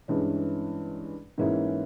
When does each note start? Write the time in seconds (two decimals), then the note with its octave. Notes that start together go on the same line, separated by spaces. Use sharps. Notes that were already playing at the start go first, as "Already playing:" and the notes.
0.08 G2 E3 G#3 C#4
1.38 G#2 E3 A#3 C#4 E4